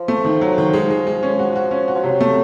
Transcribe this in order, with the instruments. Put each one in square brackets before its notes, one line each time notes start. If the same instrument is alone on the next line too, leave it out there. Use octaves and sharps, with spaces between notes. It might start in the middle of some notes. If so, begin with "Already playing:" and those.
Already playing: [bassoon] F3
[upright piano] A3
D#3
F#3
D#3
G#3
G#3
G#3
C#4
F#4
F#4
C#4
F#4
[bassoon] F3
[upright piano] C3 [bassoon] F#3
[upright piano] A3